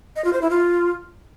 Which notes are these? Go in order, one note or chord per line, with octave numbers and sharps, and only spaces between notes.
D#5
F4
C5
E4
F4